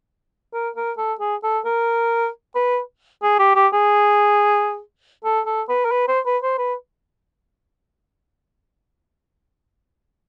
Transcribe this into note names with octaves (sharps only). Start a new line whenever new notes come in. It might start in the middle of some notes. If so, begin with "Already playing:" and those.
A#4
A#4
A4
G#4
A4
A#4
B4
G#4
G4
G4
G#4
A4
A4
B4
A#4
B4
C5
B4
C5
B4